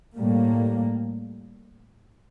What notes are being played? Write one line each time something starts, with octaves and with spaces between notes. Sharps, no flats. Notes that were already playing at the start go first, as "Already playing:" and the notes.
A2 G3 A#3